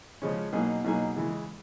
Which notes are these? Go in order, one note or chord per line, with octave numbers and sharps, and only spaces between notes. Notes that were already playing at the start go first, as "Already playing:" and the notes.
C#3 F3 G#3 C#4
B2 F#3 A#3 D#4 G#4
B2 F#3 A#3 D#4 G#4
C#3 E3 G#3